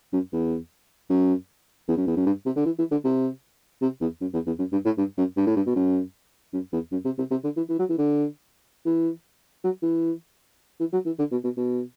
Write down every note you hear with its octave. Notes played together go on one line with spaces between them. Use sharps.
F#2
E2
F#2
E2
F#2
E2
F#2
G2
C3
D3
E3
E3
D3
C3
C3
E2
F#2
E2
E2
F#2
G2
A2
G2
F#2
G2
A2
G2
B2
F#2
F#2
E2
F#2
C3
C3
C3
D3
E3
E3
F#3
E3
D3
E3
F#3
E3
E3
F#3
E3
D3
B2
B2
B2